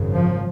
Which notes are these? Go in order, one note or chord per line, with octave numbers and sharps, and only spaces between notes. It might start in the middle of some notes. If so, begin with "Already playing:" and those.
Already playing: G#1 F#2 C#3
F3